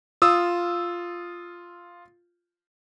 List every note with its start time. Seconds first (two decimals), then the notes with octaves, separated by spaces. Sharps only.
0.22 F4 D#6 E6